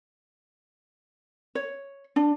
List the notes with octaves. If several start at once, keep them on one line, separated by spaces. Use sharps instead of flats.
C#5
D4